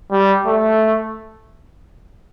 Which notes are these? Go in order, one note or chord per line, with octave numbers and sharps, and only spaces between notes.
G3
A3